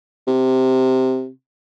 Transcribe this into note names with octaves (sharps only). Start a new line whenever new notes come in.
C3